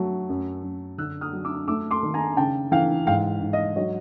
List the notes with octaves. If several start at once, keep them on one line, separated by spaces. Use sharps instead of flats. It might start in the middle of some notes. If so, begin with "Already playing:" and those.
Already playing: F#3 A3
F#2
F#2
D3 E6 F#6
D#6 F6
F#3
D6 E6
A3 D6 E6
C6 D6
D#3
G#5 A#5
C#3 G5 A5
E3 F5 G5
G#2 F5 G5
G#2
D#5 F5
F#3 C#5 D#5